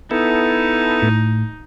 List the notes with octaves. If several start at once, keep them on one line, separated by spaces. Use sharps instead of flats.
B3 D#4 E4 A4
A2